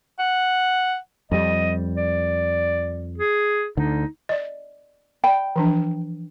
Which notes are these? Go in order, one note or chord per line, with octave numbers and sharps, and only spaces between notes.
F#5
F2 G3 D#5
D5
G#4
D2 D3 D#4
D5 D#5
D5 G5 B5
E3 F3 D4